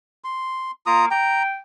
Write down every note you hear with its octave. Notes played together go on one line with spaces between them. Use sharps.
C6
A#3 F4 A#5 D#6
G5 A#5